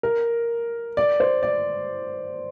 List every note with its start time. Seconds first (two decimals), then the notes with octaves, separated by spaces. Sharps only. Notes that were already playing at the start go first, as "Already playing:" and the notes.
0.03 A#4
0.97 D5
1.20 C5
1.43 D5